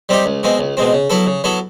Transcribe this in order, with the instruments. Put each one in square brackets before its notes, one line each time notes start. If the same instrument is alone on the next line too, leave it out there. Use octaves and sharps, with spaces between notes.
[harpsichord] G3 C4 D#4 G4
C#2
B2 G#3 C4
C#2
B2 G#3 C4
C#3
F#3 B3 E4 A4
C#3
F#3 B3 E4 A4